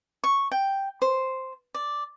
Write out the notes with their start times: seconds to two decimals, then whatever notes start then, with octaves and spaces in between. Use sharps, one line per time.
0.24 C#6
0.51 G5
1.02 C5
1.74 D5